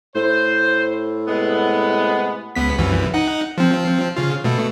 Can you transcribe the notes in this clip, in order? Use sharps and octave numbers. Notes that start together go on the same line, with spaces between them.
A2 C5
C3 G#3 B3
C#2 B3 B6
C2 F#2 E3
D#4 F#5
F3 C4
C#3 F4
B2 A3